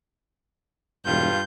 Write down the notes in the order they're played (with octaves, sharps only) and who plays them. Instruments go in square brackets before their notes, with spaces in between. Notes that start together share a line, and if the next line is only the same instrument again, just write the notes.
[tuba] E1 [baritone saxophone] G2 [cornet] F4 [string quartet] G6